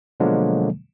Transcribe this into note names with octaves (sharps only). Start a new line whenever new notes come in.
B2 D3 F3 F#3 G#3 A#3